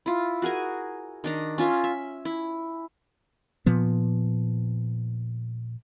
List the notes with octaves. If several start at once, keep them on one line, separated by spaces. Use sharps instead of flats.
E4 F4
F#4 G#4 A#4 G#5
D#3 D4 A#5
C#4 F4 E5
E5
E4
A#2 F3 B3